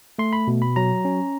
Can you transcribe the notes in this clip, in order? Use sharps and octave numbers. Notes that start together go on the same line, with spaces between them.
A3 C6
B5
B2
B5
F#3 A#5
C#4